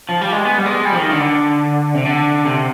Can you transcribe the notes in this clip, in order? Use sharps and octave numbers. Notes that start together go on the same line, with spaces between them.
F3
G3
G#3
B3
G3
G#3
G3
F3
D#3
D3
C3
D3
C3